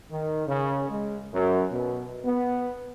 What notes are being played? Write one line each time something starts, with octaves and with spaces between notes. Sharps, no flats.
D#3
C#3
G#3
F#2
B2
B3